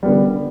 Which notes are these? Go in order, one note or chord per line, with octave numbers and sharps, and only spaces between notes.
D3 G3 B3